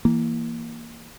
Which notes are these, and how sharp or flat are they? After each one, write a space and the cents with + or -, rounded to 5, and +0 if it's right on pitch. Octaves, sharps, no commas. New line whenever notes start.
E3 +0 A#3 +0